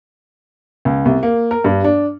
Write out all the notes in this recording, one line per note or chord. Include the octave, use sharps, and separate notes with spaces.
C#2
C2
A#3
A#4
G2
D4